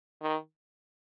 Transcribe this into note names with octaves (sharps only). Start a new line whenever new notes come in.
D#3